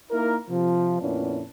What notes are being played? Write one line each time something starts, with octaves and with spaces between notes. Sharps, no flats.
A#3 D#4 E4 A#4
C3 F3
F2 A#2 B3 C#4 D4 E4